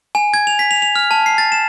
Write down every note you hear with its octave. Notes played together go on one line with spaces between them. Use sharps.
G#5
G#6
F7
B6
F7
F7
F6
A5
C7
A6
E7